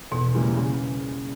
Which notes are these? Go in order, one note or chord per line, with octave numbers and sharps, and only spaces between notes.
E2 B2
C#3 E3 G3 A#3
C#3